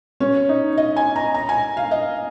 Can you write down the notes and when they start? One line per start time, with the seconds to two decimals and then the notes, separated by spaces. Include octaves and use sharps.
0.20 C#4
0.49 D#4
0.77 D#5
0.96 G#5
1.16 A#5
1.34 A#5
1.49 G#5
1.77 F5
1.91 D#5